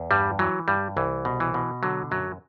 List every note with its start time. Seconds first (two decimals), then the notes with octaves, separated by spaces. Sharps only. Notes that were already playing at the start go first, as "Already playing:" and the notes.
Already playing: E2
0.11 G2 G3
0.39 E3 F#3
0.68 G2 G3
0.97 C2 E3
1.25 B2
1.40 E3
1.54 B2
1.83 D3 F#3
2.11 F#2 F#3